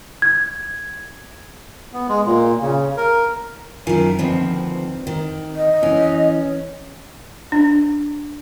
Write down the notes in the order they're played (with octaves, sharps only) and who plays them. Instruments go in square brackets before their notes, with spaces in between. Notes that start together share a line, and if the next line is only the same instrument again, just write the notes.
[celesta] G#6
[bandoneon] B3
G#3
A#2
C#3
A#4
[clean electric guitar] F#2 F4 G#5 [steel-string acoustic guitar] D#3 E4
[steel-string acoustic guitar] D2 D#3 F3 [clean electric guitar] C4 B4
[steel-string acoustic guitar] D#3
[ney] D#5
[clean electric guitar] E3 [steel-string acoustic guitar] C#4
[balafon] D4